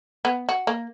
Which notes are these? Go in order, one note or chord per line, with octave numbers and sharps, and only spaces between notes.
B3
F#4
A#3